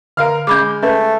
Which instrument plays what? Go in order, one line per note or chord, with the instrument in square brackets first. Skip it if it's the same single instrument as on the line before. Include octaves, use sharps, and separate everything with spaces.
[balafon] D3 [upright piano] A#4 F5 F6
[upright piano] G#3 G6 [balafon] C#4 B5 D6
[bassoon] A3 [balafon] C#4 B4